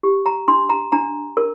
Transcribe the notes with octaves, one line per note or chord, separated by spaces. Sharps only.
G4
A#5
D4 C6
A#5
D4 A#5
A#4